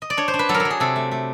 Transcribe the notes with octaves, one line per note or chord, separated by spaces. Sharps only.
D#5
D5
D4 C#5
C5
D4
B4
F#3 A4
A#4
A4
F#3
G#4
C3 A4
A3
A3